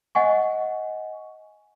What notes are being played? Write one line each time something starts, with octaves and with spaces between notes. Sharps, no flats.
D#5 F#5 G#5 C#6